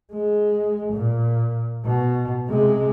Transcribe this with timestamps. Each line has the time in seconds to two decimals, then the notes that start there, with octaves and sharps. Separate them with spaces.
0.13 G#3
0.94 A#2
1.85 B2
2.48 C3 G#3